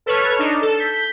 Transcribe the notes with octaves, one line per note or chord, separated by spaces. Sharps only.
A4 B4 C#5 C#6 F6
D4 D#4
A4
G6 B6